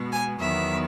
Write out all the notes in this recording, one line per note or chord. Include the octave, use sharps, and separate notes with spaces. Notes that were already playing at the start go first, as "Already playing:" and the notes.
Already playing: B2 G#3 B3
G#5
E2 D#3 F#3 B3 E5